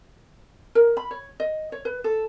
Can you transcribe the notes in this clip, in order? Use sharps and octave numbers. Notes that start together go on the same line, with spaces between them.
A#4
B5
C#5
D#5
C#5
B4
A4